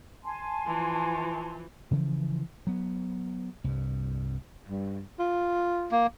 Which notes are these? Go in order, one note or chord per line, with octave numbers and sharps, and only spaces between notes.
G#5 A5 C6
E3 F3
C#3 E3 F3
F#3 B3
C2 G2
G2
F4
A#3